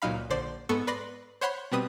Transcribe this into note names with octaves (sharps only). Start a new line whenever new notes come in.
C#2 A#2 F#3 D#4 F5 B5
A#1 D3 C5 D5
G#2 B3 A4 C#6 C#7
B4 D5 B5 C6 A#6
C5 C#5 F#5 B5 C6
B2 G3 C4 B4 B5 D#6